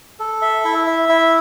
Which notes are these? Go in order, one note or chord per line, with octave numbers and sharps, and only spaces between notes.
A4
E5
E4
E5
E4